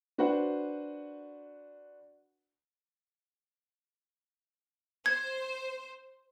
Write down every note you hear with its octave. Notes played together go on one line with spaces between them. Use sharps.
D4 F#4 B4 C5 F#5
C5 G#6